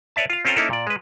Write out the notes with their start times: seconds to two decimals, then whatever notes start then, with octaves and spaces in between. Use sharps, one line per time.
0.16 B4 C#5 D5 E5 A5
0.30 F4 F5
0.45 C4 C#4 F4 A4 G5 A#5
0.56 A#3 C#4 D#4 E4 A4 A#4
0.70 A#2 D5
0.87 G#3 B4